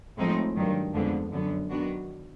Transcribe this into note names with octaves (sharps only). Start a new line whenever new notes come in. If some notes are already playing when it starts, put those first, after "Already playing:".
A2 F3 G#3 C4 D#4
G2 D#3 F#3
F2 D3 F3 G#3 B3
F#2 D3 F#3 B3
D#3 F#3 B3 D4 F#4